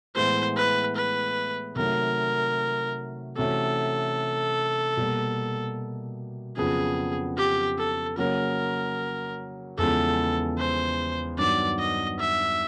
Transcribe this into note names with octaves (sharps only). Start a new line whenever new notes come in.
A2 E3 G#3 B3 C5
B4
B4
C3 D#3 F#3 A3 A#4
C3 E3 A3 C#4 F#4 A4
B2 G3 A#3
F2 C#3 F#3 B3 G#4
G4
A4
C#3 F#3 A#3 C#4 A#4
E2 C#3 F3 G#3 B3 A4
C5
G2 D#3 F#3 B3 D4 D5
D#5
E5